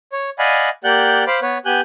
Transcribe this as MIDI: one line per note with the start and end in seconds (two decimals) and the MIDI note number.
0.13 0.30 73
0.39 0.70 74
0.39 0.70 75
0.39 0.70 77
0.39 0.70 78
0.39 0.70 80
0.39 0.70 83
0.84 1.24 58
0.84 1.24 67
0.84 1.24 74
0.84 1.24 78
0.84 1.24 90
0.84 1.24 91
1.27 1.40 72
1.27 1.40 77
1.27 1.40 83
1.27 1.40 86
1.42 1.58 59
1.42 1.58 71
1.42 1.58 73
1.66 1.81 59
1.66 1.81 67
1.66 1.81 80
1.66 1.81 90
1.66 1.81 91